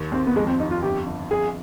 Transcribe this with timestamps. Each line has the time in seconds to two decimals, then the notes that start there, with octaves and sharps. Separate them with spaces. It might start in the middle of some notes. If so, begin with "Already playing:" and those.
Already playing: D#2
0.12 D#2 C4
0.27 B3
0.36 F2 G#3
0.47 C4
0.60 F2 D#4
0.71 F4
0.83 G1 G4
1.07 G1
1.30 F2 G#4